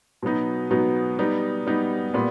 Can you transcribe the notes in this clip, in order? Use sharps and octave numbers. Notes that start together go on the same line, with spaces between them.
B2 F#3 B3 D#4
B2 F#3 B3 D#4
G3 B3 D#4
G3 B3 D#4
A#2 G3 B3